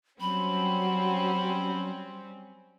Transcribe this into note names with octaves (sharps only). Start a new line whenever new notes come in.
F#3 G3 C4 C#4 B5